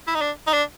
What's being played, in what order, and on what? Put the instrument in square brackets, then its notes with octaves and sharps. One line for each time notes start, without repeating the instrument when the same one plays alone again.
[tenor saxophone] E4
D#4
D4
D#4
D4